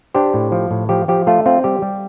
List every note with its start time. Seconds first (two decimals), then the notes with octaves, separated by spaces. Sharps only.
0.14 D4 G4 C5
0.34 A2
0.52 F3
0.71 A2
0.89 F3 G4
1.08 F3 G4
1.27 A3 F4
1.46 C4 F4
1.64 G3 G4
1.82 G3